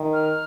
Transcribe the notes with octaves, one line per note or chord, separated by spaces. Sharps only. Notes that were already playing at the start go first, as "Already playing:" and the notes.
Already playing: D#3
F6